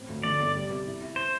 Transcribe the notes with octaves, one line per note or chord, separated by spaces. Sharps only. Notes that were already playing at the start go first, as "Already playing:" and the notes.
Already playing: A1 C4
D2
D3 D5
G1
G3
C3
E4
E4
C5